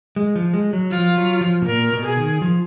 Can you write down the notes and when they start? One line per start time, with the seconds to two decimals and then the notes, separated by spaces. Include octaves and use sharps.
0.16 G#3
0.36 F3
0.53 G#3
0.73 F#3
0.91 F3 F4
1.17 F#3
1.41 F3
1.62 B2
1.66 A#2 A#4
1.92 B2
2.04 G#4
2.17 D#3
2.42 F3